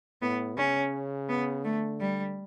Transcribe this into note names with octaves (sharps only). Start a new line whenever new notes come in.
A2 B3
C#3 C#4
B3
D3 A3
G3